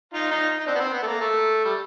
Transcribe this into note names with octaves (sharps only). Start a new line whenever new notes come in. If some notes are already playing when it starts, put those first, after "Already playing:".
D#4 F4
D#4 F4
D#4
C4 D4
B3
C4
B3
A3
A#3
A3
G3